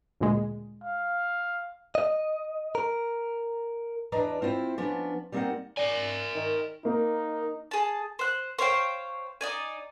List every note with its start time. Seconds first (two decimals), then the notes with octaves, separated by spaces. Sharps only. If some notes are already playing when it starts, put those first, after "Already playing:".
0.20 D2 A#2 G#3
0.84 F5
1.95 D#5
2.75 A#4
4.12 E2 D4 B4 D5 D#5 A#5
4.42 C4 E4 F4 C5
4.78 F3 B3 C#4 D4
5.32 G3 A#3 C4 D#4 A#4 F#5
5.77 A#4 D5 G#5
6.35 D#3
6.85 A#3 D#4
7.71 G#4 A5
8.19 C5 F#6
8.59 C5 C#5 F5 G5
9.41 D#4 D5 G#5